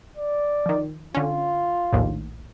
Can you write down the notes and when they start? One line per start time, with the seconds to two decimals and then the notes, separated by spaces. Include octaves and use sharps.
0.17 D5
0.66 D#3 F3
1.15 D3 C#4 F4
1.93 A#1 D#2 A2